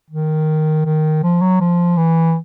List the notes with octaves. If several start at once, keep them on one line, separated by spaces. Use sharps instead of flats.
D#3
D#3
F3
F#3
F3
E3